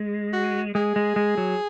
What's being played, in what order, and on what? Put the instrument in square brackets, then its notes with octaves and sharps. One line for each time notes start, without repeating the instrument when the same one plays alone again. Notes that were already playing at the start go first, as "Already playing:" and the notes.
Already playing: [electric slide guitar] G#3
[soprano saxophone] F#4
[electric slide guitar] G#3 [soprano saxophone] G#4
[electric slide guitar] G#3
G#3
F#3